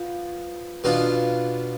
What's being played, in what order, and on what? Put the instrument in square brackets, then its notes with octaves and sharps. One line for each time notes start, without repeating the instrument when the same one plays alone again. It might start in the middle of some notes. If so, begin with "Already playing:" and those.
Already playing: [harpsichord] F3 B3
B2 B3 D4 F4